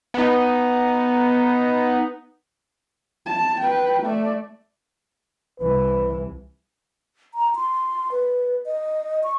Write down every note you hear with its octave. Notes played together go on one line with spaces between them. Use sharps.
B3 D#4
A5
B4 G5
A3 D5
C2 E3 B4
A#5
C6
B4
D#5
C#6